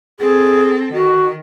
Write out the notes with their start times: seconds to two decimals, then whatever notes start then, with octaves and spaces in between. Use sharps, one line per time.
0.20 C4 G#4 A4
0.94 D#3 F#4